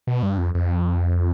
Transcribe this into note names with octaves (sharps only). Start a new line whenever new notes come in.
B2
G2
F2
F2